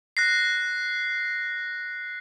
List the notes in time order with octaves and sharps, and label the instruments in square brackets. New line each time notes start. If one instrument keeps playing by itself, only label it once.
[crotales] F#6 A#6 C7